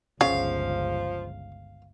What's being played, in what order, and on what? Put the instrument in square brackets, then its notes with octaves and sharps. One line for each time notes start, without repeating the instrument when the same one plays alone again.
[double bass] G1 C#2 [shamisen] C#3 [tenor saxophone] F3 [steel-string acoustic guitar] F5